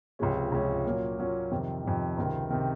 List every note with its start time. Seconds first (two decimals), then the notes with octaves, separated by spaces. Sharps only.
0.19 C#2 C3 F3 G#3 C#4
0.52 C#2 C3 F3 G#3 C#4
0.85 A#2 F#3 A#3 C#4
1.18 A#2 F#3 A#3 C#4
1.51 F2 C3 D#3
1.84 F2 C3 D#3
2.17 C#2 C3 D#3
2.50 C3 D#3